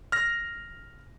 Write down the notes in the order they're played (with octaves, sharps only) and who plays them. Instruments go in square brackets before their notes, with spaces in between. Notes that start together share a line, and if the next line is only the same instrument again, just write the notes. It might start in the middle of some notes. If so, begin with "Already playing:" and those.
[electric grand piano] F6 A#6